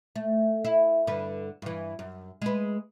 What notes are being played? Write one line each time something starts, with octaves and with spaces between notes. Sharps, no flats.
A3
E4
G2 D3 B4
G2 E3
F#2
G#3 B4